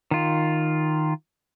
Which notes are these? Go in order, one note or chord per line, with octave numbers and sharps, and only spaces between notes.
D#3 F4